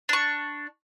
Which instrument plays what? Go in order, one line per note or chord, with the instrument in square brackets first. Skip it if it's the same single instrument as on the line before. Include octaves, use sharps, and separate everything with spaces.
[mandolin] D4 C#6